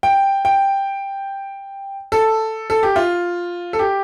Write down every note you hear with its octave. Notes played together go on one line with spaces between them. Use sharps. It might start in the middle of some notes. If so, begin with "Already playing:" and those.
G5
G5
A4
A4
G4
F4
A4
G4